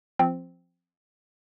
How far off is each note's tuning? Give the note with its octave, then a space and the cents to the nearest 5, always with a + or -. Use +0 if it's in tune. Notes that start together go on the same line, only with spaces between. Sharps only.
F3 +0 C4 +0